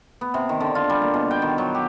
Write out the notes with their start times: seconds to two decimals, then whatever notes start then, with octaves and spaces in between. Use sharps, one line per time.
0.21 B3
0.34 C3
0.49 D#3
0.60 D3
0.75 F4
0.89 G3
1.02 A#3
1.14 B2
1.31 G5
1.42 D#3
1.58 F#3
1.75 G4